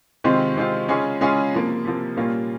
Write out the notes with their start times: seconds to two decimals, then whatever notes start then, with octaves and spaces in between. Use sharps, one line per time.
0.24 C3 D#3 G#3 C4 F4
0.56 C3 D#3 G#3 C4 F4
0.88 C#3 G#3 C#4 F4 G#4
1.21 C#3 G#3 C#4 F4 G#4
1.52 C3 F3 A#3
1.85 C3 F3 A#3
2.16 A#2 G3 A#3 C#4 F4